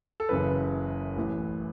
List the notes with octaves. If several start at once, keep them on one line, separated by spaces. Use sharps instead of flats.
A4
F#1 F#2 C#3 E3 B4
A1 A2 E3